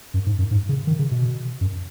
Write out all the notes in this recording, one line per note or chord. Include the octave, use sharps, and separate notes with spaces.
F#2
G#2
F#2
G#2
C#3
D#3
C#3
B2
F#2